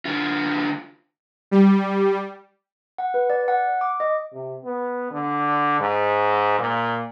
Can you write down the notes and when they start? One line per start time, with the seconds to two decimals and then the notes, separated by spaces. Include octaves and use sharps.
0.05 D3 F4
1.51 G3
2.98 F#5
3.14 B4
3.30 D5
3.48 F#5
3.81 D6
4.00 D#5
4.32 C3
4.64 B3
5.11 D3
5.80 G#2
6.59 A#2